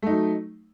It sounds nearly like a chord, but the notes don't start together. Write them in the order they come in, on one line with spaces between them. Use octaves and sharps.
A3 D#4 F#3